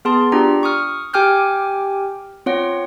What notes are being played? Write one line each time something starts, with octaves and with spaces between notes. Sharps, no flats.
B3 G#4 A5 C6
D4 F4 G4 A#5
C#6 D#6 F6
G4 G5 G#5 D6 F6 G6
C4 F4 C#5 F#5